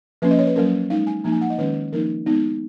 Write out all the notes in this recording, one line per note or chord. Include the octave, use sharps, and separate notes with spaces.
F3 A#3 C#4 B4
D#5
C#5
B4
F#3 A#3 C#4 A#4
G#3 D#4 F5
G#5
F3 A#3 D#4 A#5
G#5
F#5
D#5
D#3 G#3 C#4 B4
F3 A#3 D#4 A#4
G#3 B3 D#4